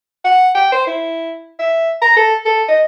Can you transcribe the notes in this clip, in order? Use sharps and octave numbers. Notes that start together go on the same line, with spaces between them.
F#5
G5
C5
E4
E5
A#5
A4
A4
D#5